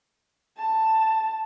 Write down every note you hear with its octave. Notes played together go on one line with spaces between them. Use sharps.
A5